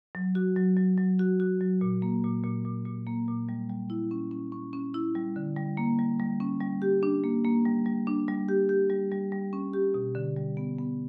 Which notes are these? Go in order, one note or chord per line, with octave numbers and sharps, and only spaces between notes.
F#3
F#4
F#3
F#3
F#3
F#4
F#4
F#3
A#2
A#3
A#2
A#2
A#2
A#2
A#3
A#2
G3
G3
E4
C#4
C#4
C#4
C#4
E4
G3
D3
G3
A#3
G3
G3
C#4
G3
G4
D4
A#3
A#3
G3
G3
D4
G3
G4
G4
G3
G3
G3
C#4
G4
B2
D3
G3
B3
B3